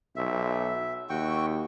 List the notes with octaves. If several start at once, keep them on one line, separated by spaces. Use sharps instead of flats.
B1 E5
D#2 F#4 G5 C#6